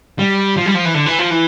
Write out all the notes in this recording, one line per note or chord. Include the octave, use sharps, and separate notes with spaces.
G3
F3
G3
F3
E3
D3
E3
F3
E3